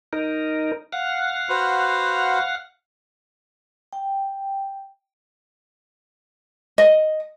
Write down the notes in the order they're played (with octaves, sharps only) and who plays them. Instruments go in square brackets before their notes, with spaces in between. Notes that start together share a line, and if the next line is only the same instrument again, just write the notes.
[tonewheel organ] D#4 A#4
F5 F#5
[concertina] F#4 B4 C5
[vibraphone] G5
[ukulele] D#5